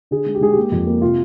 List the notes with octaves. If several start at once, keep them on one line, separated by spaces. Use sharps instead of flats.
D3 G#4
G#3
G4
G#3 G#4
A#3 G4
F2
A#3
C3 F4